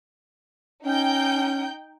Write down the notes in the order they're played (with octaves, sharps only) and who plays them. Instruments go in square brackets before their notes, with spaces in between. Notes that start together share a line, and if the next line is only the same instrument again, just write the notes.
[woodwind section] C#4 [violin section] D#4 G5 G6